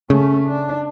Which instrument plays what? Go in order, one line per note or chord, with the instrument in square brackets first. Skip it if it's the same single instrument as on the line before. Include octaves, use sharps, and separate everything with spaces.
[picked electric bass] C#3 [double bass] A3 C#4
[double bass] D4